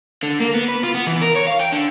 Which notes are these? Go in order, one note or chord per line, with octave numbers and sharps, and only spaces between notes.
D3
A#3
B3
B4
F4
B3
E3
A#4
C#5
F5
G5
D3